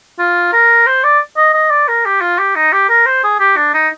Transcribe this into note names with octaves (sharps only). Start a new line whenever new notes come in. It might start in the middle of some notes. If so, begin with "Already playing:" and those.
F4
A#4
C5
D5
D#5
D#5
D5
A#4
G4
F4
G4
D#4
G4
A#4
C5
G#4
G4
D4
D#4